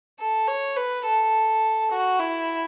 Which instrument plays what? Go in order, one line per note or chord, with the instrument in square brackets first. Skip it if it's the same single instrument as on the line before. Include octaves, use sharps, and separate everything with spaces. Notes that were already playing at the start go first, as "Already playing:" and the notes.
[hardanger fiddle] A4
C#5
B4
A4
F#4
E4